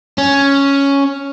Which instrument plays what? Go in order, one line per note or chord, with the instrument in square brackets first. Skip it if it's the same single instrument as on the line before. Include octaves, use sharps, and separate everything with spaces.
[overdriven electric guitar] C#4